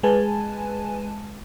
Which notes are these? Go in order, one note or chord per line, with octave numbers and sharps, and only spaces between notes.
G#3 B4 G#5 A5